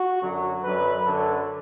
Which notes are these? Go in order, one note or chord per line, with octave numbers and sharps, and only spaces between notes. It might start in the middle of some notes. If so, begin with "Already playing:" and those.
Already playing: F#4
F#2 D3 F#3
F#2 D3 F#3 B4
F#2 D3 F#3 A4